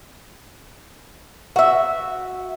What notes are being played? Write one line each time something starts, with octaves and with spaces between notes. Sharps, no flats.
F#4 E5